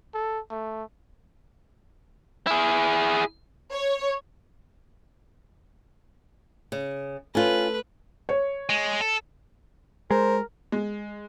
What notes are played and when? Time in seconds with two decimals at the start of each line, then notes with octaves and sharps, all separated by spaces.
0.14 A4
0.51 A3
2.47 E4 G#4
3.72 C#5
6.72 C#3
7.35 A3 C#4 F4 B4
8.29 C#5
8.69 G#3
9.01 A4
10.11 G#3 A#4 C5
10.72 G#3